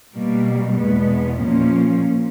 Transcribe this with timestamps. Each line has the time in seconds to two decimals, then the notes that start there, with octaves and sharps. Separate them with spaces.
0.14 B2 G3 A#3
0.77 E2 B2 G#3 B3
1.40 A#2 F3 A#3 C#4